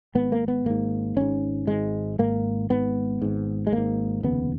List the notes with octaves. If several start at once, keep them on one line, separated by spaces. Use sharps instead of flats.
G#1 G#2 B3
A#3
B3
G#1 G#2 A#3
G#1 G#2 C#4
G#1 G#2 G#3
G#1 G#2 A#3
G#1 G#2 B3
G#1 G#2
G#3
G#1 G#2 A#3
F1 D#2 C#3 B3